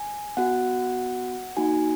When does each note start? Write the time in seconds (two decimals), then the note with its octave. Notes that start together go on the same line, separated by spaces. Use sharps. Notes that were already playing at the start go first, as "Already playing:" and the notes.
Already playing: G#5
0.37 B3 F#4 F#5
1.57 A#3 D#4 F#4 G#5